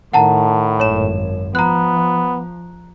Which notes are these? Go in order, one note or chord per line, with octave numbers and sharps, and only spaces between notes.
A2 D#3 F#5 A5 A#5
G#1 F#2 C#5 E7
F3 B3 A#5 F#6